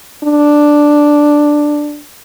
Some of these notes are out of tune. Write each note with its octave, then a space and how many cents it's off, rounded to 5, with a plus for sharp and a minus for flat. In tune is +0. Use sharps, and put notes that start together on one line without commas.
D4 +5